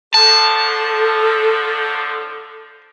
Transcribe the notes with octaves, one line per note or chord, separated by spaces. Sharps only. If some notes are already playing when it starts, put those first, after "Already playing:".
A2 D3 F3 A4 A5